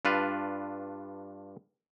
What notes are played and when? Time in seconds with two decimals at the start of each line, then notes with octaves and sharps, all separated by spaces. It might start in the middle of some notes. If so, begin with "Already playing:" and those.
0.05 G2 D4 F4 B4